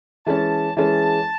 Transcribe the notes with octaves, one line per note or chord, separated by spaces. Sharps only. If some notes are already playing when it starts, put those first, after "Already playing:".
E3 G#3 C#4 A5
E3 G#3 C#4 A5